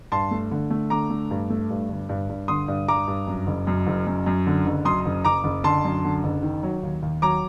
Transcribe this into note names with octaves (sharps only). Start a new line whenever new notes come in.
G2 A5 C6
A3
D3
A3
D3 A#5 D6
A3
G2
A3
G2
G1
G2
G2
D3 C6 D#6
G2
G2 A#5 D6
G2
F#2
F#1
F#2
F#1
F#2
F#2
D3
F#1
F#2 C6 D#6
F#1
F#1 A#5 D6
F#1
D3 A5 C6
F#2
D3
F#1
D#3
F#3
D#2
D#2
F#3 A#5 D6